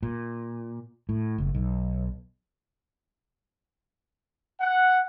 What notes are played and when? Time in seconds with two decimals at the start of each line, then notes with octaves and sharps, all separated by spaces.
0.03 A#2
1.09 A2
1.38 F#1
1.55 B1
4.61 F#5